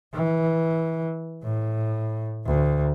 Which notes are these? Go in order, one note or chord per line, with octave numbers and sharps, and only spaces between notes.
E3
A2
D2